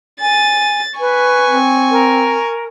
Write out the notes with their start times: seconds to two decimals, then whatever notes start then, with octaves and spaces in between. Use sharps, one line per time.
0.21 G#5 A6
0.99 B4 G#5 C#6
1.49 C4
1.91 A#4